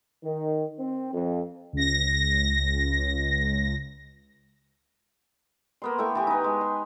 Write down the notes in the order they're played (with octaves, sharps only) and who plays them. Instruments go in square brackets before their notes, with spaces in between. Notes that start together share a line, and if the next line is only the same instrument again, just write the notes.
[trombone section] D#3
C4
F2
[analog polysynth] C#2 A#6
[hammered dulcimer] A#3 B3 C6
A3 E4 G5 C#6
E3 G4 G#5
D#4 B4
G#3
C6